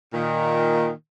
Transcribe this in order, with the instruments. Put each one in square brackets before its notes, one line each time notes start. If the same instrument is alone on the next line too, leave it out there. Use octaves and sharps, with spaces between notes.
[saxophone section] A#2 D#3